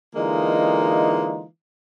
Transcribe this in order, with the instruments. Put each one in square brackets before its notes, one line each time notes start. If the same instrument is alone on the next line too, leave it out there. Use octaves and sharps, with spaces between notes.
[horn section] D3 E3 G#3 A#3 D#4 F4